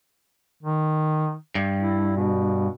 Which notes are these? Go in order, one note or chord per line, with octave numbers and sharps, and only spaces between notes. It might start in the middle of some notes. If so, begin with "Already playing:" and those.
D#3
G2
E4
B2